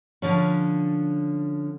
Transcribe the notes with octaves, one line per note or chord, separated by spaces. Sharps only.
D3 F3 C#4